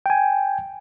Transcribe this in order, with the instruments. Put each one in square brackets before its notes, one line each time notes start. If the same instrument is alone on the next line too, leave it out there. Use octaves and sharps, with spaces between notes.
[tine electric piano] G5 G#5